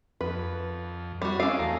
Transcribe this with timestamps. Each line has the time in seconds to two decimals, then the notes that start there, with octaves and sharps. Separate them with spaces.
0.21 F2 B4
1.22 G3 F#4
1.40 C#4 E4 D5 D#5 F5
1.59 E2 A3 A#5